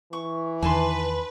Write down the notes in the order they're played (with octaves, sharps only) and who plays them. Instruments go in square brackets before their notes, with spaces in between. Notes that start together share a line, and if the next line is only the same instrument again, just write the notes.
[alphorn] E3 [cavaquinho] C#6
[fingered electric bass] E2 D#3 [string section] B4 [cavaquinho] G#5 A5 C6